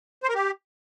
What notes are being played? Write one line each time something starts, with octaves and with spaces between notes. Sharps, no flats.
C5
A#4
G4